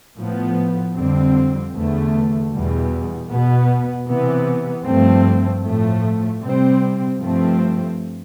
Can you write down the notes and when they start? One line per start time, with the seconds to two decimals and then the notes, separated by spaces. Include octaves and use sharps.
0.17 A2 F3 B3
0.95 F2 D3 G3 C4
1.73 E2 D3 A3
2.50 E2 B2 G3
3.28 B2 B3
4.07 C3 E3 B3
4.84 G2 F3 A3 C4
5.63 A2 F3 A3
6.41 C3 G3 C4
7.19 G2 F3 A3 C4